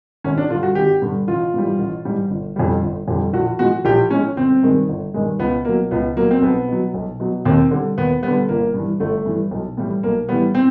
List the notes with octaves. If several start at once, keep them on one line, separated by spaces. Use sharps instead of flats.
G#1 C#4
D4
G2 D3 F4
F#4
G#1 G4
G2 D3
A1 F4
G#2 E3 G3
A1
G#2 E3 G3
G1
F2 D3 G3
G1
F2 D3 G3
A#1 F#4
A2 F3 G#3 F#4
A#1 G4
A2 F3 G#3 C#4
G1 C4
G2 D#3 G#3
G1
G2 D#3 G#3
C#2 B3
B2 F#3 A#3
C#2 B3
B2 F#3 A#3
C4
B1 B3
B2 F#3
B1
B2 F#3
D#2 C4
D3 G3
D#2 B3
D3 G3 B3
G1 A#3
G2 E3
G1 A3
G2 E3
B1
A2 E3 G3
B1 A#3
A2 E3 G3 B3
C4